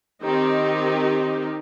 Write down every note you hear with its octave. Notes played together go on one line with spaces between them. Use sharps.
D#3 C4 D#4 G4